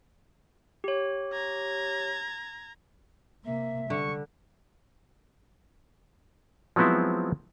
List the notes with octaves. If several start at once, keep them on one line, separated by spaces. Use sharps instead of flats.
G4 C#5
A#5 G#6
C3 A#3 E5
D3 G3 C#6
F3 F#3 G#3 B3 C4 E4